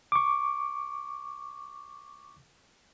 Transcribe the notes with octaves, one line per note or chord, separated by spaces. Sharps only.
C#6 D6